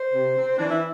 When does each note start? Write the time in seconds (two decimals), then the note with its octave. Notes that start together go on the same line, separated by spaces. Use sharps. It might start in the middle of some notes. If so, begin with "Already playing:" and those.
Already playing: C5
0.13 C3
0.36 C4
0.58 E3 D4
0.70 E4